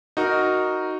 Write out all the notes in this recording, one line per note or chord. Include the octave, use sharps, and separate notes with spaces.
D#4 F#4 A#4